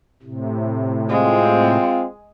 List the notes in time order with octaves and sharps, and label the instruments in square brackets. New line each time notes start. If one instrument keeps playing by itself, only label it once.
[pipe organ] A2 C3
[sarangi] G#3 [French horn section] C4 F4